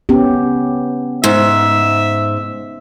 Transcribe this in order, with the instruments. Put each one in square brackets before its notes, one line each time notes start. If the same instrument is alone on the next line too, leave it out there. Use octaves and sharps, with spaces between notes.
[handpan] B3 C#4 G4
[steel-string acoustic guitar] G#2 [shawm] E5